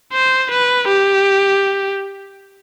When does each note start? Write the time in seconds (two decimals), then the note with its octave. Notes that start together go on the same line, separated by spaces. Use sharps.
0.13 C5
0.51 B4
0.88 G4